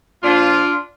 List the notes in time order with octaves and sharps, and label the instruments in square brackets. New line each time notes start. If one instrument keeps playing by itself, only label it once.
[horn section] A#2 F3 D4 F4